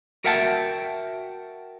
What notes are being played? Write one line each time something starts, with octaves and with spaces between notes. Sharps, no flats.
F#4 A#4 E5 F#5 G5 A5